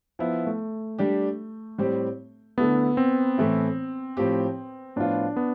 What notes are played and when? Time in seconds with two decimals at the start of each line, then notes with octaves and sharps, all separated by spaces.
0.19 F3 B3 E4
0.47 A3
0.99 G3 D4 G4
1.78 A2 G3 C4 G4
2.58 D3 A3 B3 E4
2.97 C4
3.38 A2 E3 A3 E4
4.17 A2 F3 C4 G4
4.96 A2 F3 B3 D4 F4
5.36 B3